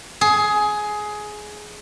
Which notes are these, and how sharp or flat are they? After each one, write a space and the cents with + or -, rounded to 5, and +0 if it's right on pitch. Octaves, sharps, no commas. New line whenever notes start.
G#4 +15